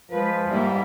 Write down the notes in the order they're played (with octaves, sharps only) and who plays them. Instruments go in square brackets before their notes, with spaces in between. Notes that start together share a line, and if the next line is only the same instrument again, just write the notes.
[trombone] F3 [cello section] G#3 B4
[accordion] G#2 G3 [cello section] A#3 E4